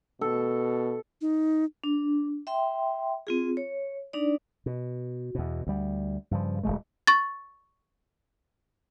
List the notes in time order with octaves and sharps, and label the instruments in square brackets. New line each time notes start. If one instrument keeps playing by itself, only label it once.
[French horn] B2 [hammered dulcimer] A4
[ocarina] D#4
[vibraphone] D4
E5 G5 C6
C4 F4 G#4
C#5
D4 D#4 D5
[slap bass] B2
E2 B2
D2 G3
G2 C#3 F3
D1 E2 G#3 A3
[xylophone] C#6 A6